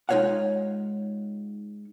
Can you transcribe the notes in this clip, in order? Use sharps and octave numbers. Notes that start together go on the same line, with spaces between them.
G#3 D#4 F4 C#5 F5 F#5